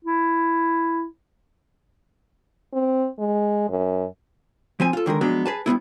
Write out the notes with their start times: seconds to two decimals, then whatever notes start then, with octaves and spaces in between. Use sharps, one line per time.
0.05 E4
2.74 C4
3.19 G#3
3.69 F#2
4.80 F3 C4 G#5
4.93 F4 A4
5.06 D3 D#3 G#3 A#4
5.21 F3 F#3 G#3 B3 D4
5.46 G#4 B4 A5
5.66 G2 G#3 B3 E4